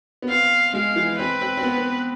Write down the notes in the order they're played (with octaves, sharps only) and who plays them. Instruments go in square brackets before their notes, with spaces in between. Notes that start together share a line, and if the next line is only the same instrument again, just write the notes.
[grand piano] B3
[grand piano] C4 [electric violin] F5
[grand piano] G#3 [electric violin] F5
[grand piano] E3
[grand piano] C4 [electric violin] B4
[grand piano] C4
C4
B3
B3